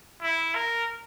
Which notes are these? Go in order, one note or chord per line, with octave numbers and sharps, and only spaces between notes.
E4
A#4